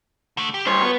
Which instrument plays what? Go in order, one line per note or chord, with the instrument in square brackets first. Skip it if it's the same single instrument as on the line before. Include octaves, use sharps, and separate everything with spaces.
[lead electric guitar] D3 A3
G4
[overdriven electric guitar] G2 C5 [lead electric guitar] C#5
[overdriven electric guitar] B3